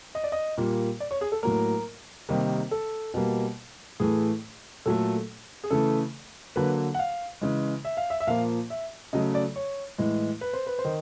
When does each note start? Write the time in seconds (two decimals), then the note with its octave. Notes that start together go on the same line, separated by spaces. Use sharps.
0.15 D#5
0.24 D5
0.32 D#5
0.58 A#2 G3 A#3
1.00 D5
1.11 C#5
1.21 G#4
1.32 A4
1.43 A2 F#3 A#3 A#4
2.29 C3 D#3 G3 A#3
2.71 A4
3.14 B2 G3 A#3
4.00 A2 E3 A3 G#4
4.86 A#2 F#3 A3 A4
5.64 G#4
5.71 C#3 E3 A3 A4
6.56 D3 F#3 A#3 B4
6.94 F#5
6.99 F5
7.42 C#3 E3 G#3
7.85 E5
7.97 F5
8.10 E5
8.20 E5
8.27 A#2 F3 A#3 F5
8.70 E5
9.13 C#3 F#3 A3 D#5
9.35 D5
9.56 C#5
9.98 A2 E3 G#3
10.41 B4
10.53 C5
10.67 B4
10.79 C5
10.85 D#3